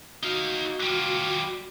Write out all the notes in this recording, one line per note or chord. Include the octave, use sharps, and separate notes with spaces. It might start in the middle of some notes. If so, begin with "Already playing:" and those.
D#4 F#4 F5
G3 F4